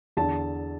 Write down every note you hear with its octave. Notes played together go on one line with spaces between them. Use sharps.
E2 D3 A5